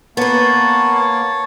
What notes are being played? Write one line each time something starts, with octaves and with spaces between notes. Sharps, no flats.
A#3 B3 B4 C#5 A5